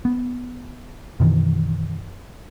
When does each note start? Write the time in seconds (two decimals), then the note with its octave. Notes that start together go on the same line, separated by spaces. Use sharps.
0.05 B3
1.20 F#2 B2 D#3 E3